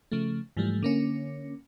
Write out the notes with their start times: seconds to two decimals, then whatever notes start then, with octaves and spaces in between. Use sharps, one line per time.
0.12 C#3 F3 A3
0.57 G#2 E3 F3 G3 A3
0.83 D3 A#3 C#4